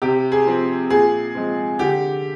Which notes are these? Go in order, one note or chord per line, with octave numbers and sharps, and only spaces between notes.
C3 G4
G#4
F3 C4
A#2 G#4
F3 G#3 C4
D3 G4